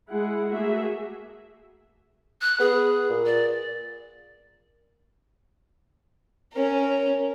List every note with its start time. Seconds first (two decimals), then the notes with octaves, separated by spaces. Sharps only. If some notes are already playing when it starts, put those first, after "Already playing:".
0.10 G#3 E4 G#4 F#5
0.51 A3 A#3 F#4 G#4 E5
2.41 F#6
2.60 B3 G#4
3.10 A#2
3.26 D5
6.53 C#4 A#4